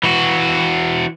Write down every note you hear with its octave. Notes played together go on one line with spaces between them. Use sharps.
E3 F#4